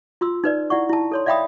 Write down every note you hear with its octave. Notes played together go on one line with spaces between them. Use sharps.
F4 C6 E6
D#4 B4 D5
E4 D5 F#5 C#6
E4 A5
A4 C#5 C6
D5 E5 F5 G5 B5 D#6